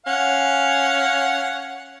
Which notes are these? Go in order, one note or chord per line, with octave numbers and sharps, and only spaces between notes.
C#4 F5 F#5